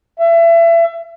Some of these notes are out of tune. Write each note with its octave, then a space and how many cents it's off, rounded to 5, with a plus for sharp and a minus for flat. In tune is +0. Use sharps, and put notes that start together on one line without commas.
E5 +30